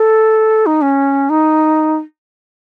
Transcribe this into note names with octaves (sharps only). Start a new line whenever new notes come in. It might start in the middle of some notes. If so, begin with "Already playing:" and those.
Already playing: A4
D#4
C#4
D#4